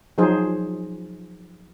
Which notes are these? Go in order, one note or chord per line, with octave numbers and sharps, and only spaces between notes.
F3 F#3 D#4 G#4 C5